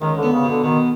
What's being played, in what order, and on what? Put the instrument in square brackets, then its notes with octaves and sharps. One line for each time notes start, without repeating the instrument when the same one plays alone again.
[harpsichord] C#2 [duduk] D#3
[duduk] D3
[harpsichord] B3
[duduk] C#3
[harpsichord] B2 [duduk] D3
[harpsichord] B2 [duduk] D#3